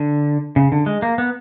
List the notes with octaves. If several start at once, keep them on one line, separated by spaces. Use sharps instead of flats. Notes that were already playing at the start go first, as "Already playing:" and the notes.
Already playing: D3
C#3
D3
G#3
A#3
B3